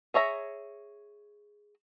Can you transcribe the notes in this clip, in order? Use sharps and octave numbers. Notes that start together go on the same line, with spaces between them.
G#4 C#5 E5 A#5